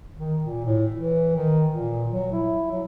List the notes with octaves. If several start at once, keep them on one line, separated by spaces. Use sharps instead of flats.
D#3
A#2
A2
E3
D#3
A#2
F#3
E4
F#3